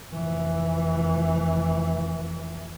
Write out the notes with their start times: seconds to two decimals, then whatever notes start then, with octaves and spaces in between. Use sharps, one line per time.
0.12 F1 E3